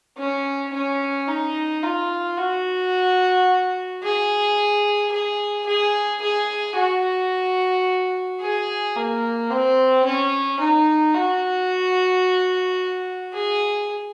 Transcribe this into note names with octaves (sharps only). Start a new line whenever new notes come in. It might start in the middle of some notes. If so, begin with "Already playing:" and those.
C#4
C#4
D#4
F4
F#4
G#4
G#4
G#4
G#4
F#4
G#4
A#3
C4
C#4
D#4
F#4
G#4